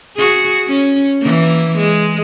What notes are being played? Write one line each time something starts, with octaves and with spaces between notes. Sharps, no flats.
F#4 G#4
C#4
E3 A#3
G#3